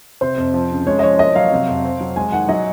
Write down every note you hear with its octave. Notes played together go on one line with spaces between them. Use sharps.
C3 C5
F2
F3
C#3
G#3 C#5
D#5
F3 C#5
A#3 D#5
F#3 F5
C3
F2
C4
F#3
G#3 G#5
D#3 F#5
F#3 D#5